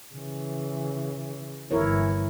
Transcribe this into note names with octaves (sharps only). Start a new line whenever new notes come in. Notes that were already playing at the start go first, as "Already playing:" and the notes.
C#3 E3
G1 E3 E4 A#4 C#5